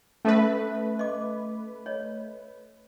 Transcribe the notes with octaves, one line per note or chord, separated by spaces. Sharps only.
A3 C#4 A4 B4 E5
D#5 D6
C#5 D#5